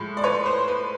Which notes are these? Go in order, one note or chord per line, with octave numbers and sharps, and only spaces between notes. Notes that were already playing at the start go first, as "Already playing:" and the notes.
Already playing: A2 F3 G#3
D5
B4 C#5
C5
B4